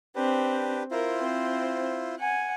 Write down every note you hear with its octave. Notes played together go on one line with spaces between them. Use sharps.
C4 D4 G4 B4
E4 F4 A#4 C5
C4
F#5 G#5